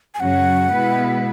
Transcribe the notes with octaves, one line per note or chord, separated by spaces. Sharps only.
G#5
F#2 C#3 F#3 C#4 F#4 F#5
B2 G#3 B3 E4 B4